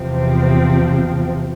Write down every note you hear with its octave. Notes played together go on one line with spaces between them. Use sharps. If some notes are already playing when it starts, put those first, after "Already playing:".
Already playing: E2 C3 F3 C4